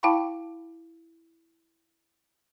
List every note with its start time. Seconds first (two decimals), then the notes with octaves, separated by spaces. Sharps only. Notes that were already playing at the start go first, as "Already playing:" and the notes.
0.03 E4 F5 G5 A5 B5 C#6